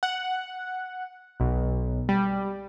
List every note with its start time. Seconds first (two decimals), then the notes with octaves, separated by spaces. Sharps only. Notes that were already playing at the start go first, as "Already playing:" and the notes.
0.03 F#5
1.40 B1
2.09 G3